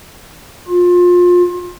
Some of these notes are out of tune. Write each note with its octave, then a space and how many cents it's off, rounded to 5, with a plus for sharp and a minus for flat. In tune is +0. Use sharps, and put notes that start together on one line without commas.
F4 +25